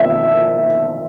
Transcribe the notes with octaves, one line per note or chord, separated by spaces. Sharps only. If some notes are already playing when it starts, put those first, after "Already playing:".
Already playing: E5